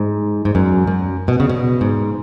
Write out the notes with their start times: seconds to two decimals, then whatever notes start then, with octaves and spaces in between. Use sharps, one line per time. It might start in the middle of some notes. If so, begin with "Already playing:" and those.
Already playing: G#2
0.45 G#2
0.55 F#2
0.87 F#2
1.28 B2
1.40 C#3
1.50 B2
1.81 G#2